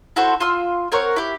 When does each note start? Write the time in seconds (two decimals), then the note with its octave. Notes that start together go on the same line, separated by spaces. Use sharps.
0.16 E4 F#4 A4 C5
0.40 F4 C6 E6
0.92 C4 A#4 C#5 F#5
1.16 E4 G4